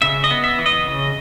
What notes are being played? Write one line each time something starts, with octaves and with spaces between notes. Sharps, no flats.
C#3 E5
D#5
B3
E5
E3
D#5
C#3